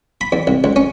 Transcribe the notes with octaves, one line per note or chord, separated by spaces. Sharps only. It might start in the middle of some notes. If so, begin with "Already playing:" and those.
B5
E2
C2
C#2
C#4